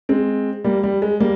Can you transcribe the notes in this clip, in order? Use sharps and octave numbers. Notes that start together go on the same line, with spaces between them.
G#3 C4
G3 A#3
G3
G#3
G3 A#3